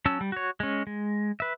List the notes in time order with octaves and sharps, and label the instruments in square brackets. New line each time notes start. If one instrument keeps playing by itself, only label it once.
[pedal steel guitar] F#3 C#4 A5 E6
G3
F#4 C#5
G#3 C#4
G#3
B4 E5